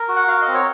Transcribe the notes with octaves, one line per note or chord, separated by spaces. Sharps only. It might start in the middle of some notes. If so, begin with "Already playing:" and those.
Already playing: A#4
F#4
F#5
F#4 F5
D#5
C4
C#5